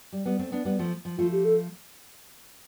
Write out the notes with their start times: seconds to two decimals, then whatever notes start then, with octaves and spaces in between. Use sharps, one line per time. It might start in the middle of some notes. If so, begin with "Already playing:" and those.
0.12 G3
0.25 G3 B3
0.39 A3 C4
0.52 B3 D4
0.65 G3 B3
0.79 F3 A3
1.05 F3
1.18 F3 A3 F4
1.32 G4
1.45 A4